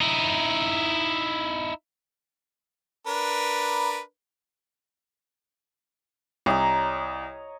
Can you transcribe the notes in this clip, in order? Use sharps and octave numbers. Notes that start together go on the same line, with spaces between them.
D#4 E4
D4 A#4 B4
C2 C#5 D#5 A#5